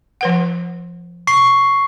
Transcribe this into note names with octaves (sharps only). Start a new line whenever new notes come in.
F3 B4 F#5
C#6 C7